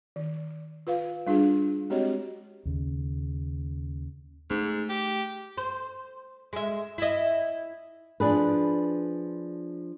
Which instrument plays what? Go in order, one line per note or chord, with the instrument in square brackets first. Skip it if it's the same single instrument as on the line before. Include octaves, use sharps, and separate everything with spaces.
[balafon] D#3
F4 B4 F5
G3 D4 F4 G#4
G#3 C4 F#4 G4 C#5 D#5
[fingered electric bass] D#2 C#3
[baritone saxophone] G#2 [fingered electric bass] A3
[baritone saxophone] G4
[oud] C5
G#3 E5
E4 D#5
[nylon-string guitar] F3 D4 G#4 B4